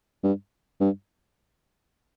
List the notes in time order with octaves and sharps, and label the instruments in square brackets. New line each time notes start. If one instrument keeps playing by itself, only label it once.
[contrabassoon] G2
G2